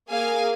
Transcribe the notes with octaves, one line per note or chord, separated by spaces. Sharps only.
A#3 G#4 F5 G#5